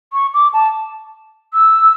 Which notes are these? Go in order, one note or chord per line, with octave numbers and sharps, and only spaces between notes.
C#6
D6
A5
E6